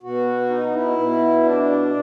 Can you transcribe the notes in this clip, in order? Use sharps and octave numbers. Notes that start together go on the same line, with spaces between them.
B2 F#4
D#4
E4
B2
D4